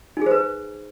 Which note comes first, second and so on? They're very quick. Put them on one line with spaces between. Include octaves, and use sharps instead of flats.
D#4 G#4 C5 B4